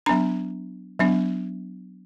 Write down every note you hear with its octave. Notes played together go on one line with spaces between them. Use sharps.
F#3 B3 D4 A#5
F#3 B3 D4